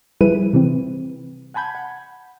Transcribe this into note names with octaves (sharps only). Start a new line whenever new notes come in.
F3 G3 E4 G#4 B4 D#7
C3 E3 C4
F#5 G#5 A5 B5 G6 G#6
F#5